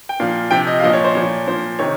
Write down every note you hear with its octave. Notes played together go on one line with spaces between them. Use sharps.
G5
A#2 F3 F5
C3 F3 G5
D#5
F5
A#2 F3 D#5
C#5
C5
A#2 F3 C#5
A#2 F3 C5
C3 D#3 C#5